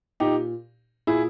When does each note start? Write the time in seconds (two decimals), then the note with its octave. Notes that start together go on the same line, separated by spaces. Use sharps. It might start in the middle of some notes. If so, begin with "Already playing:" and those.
0.20 A#2 D#4 G4
1.07 A#2 E4 G#4